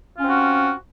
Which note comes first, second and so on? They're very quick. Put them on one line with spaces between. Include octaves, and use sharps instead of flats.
F4 C#4 C4 F#4